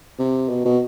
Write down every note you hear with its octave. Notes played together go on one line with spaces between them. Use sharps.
C3
B2
B2